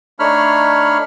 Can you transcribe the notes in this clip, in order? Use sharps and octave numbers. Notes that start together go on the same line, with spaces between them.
A3 D4 D#4 C#5 B5 F6